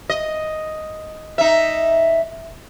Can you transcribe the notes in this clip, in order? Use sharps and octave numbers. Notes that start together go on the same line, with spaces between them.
D#5
D#4 E5